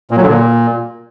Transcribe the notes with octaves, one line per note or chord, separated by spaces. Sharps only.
A#2
F#3
D3
A#2